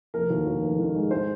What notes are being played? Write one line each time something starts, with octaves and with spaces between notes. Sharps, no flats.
F1 A#4
D#2
D#2
F1
D#3
G#3
G#2 C5